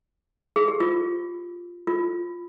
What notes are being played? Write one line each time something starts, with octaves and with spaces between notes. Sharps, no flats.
G#4
G4
F4
F4